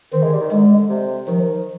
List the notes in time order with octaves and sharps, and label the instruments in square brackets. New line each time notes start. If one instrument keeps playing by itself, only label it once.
[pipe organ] D#3 [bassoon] C4
[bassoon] G#3
G3
D#3
[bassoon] D3 [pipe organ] G#3
[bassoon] C3
[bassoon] D#3 [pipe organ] F3